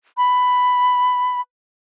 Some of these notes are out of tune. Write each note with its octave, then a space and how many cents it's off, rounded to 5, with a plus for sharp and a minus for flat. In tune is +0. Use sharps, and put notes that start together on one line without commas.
B5 +10